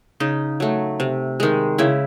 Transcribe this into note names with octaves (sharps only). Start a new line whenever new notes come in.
C#3 D#4
F#3 A3
C3
D#3 G#3
C#3 E4